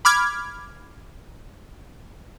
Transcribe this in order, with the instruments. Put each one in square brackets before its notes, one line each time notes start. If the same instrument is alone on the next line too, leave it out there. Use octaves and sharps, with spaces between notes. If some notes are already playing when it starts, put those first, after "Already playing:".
[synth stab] B5 D6 F6 G#6